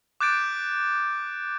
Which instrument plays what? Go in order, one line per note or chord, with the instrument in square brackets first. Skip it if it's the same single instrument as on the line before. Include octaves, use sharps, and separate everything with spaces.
[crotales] D6 F#6 G6 A6 D7